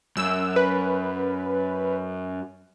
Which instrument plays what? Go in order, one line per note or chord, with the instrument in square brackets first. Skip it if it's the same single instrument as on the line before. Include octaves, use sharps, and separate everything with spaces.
[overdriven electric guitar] F#2 [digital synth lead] E6
[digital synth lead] B4